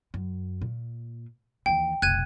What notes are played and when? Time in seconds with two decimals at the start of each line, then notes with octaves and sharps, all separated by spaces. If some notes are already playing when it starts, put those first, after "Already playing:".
0.14 F#2
0.62 A#2
1.66 D#2 E3 G5
2.02 F1 B1 F#6 G#6 D#7